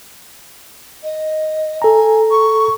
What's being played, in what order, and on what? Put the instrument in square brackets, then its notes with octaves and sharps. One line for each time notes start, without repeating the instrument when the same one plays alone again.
[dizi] D#5
[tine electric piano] A4 A#5 [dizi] G#5
[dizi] C#6